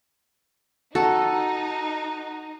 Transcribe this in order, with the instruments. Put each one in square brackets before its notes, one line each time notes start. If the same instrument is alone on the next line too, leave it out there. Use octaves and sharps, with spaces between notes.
[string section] D#4 [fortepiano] F#4 [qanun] A4